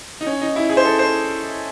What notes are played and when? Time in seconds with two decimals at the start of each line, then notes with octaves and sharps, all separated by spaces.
0.21 D#4
0.27 C#4
0.42 D#4
0.56 E4
0.69 G#4
0.77 C5
0.85 A4
0.99 C5